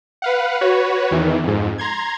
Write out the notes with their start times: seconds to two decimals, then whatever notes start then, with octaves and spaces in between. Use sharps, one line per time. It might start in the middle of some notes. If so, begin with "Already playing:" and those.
0.22 B4 F5 F#5
0.61 F#4 B4 C#5
1.11 E2 D#3 E3
1.44 F2 G#2
1.78 A#5 C6 G#6